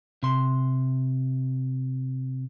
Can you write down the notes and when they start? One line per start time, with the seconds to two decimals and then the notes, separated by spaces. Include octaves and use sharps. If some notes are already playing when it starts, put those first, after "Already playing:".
0.23 C3 C6